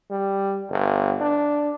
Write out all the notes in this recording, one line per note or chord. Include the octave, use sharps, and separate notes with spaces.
G3
G1
D4